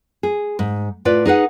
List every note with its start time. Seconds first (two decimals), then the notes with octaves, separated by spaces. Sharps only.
0.23 G#4
0.59 G#2
1.05 A2 F4 B4 D5
1.26 D#4 G#4 B4 F#5